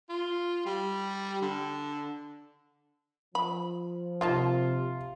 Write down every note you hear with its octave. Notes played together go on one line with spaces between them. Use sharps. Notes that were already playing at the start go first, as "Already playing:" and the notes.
F4
G3
D3
F3 B5
C3 A#3 D#4 F4 A5